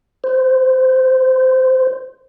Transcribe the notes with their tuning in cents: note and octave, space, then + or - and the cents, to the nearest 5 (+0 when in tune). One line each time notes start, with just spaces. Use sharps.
C5 -15